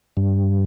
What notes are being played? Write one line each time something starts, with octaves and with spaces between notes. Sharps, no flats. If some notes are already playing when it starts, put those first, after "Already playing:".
G2